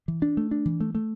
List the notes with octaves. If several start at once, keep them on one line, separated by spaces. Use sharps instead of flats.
E3
D4
A3
D4
E3
A3
A3